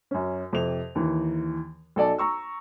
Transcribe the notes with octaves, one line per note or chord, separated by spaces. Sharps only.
F#2 C#4
F2 C3 F7
D#2 E3
B1 A4 D5 A5
A#5 C#6 E6